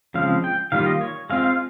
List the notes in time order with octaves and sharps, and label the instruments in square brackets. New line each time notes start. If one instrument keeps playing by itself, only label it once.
[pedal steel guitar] C#3 F3 G#3 C4 F5
G5
D#3 G3 A#3 F4 F5
D#5
C#5
G#3 C4 F4 F5
F5